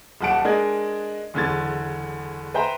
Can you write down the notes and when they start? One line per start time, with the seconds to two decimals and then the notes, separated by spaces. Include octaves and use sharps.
0.21 D#1 B1 F#5 A5 D7
0.45 G#3 D4 A#4 D#5 G#6
1.34 F#1 E2 D3 G#6 A6
2.54 B4 C5 E5 G5 A#5